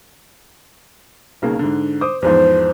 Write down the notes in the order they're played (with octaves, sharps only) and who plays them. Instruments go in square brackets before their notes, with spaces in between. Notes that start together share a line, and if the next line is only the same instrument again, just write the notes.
[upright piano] B1 C#3 A#3
G#2 D3
C5 D6 D#6
[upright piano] E2 G#2 F3 [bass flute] C5